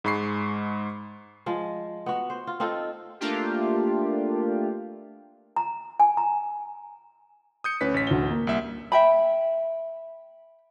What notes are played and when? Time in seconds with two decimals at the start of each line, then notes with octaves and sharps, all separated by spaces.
0.04 G#2 G#3 B5 C#6 C7
1.46 F3 G#3
2.06 B3 F#4
2.30 C5
2.47 F4
2.60 C4 D#4 F4 A4
3.20 A3 A#3 D4 F4 G4
5.56 A#5
6.00 G#5
6.17 A#5
7.64 D#6 G6 C#7
7.81 D2 C#4 B4 B6
7.94 A1 B6
8.07 D2 G7
8.31 A#3
8.47 C2 E5
8.92 E5 G5 B5